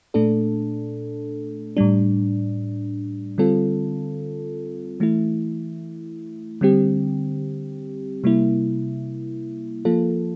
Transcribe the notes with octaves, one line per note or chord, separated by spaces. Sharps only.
A#2 A3 D4 A4
A2 G3 D4
D3 G3 C4 F4 A4
E3 A3 E4
D3 G3 C4 G4
C3 G3 A#3 E4
F3 A#3 F4 A4